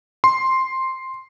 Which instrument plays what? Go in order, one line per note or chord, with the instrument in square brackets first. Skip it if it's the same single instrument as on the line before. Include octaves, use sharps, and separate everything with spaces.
[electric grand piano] C6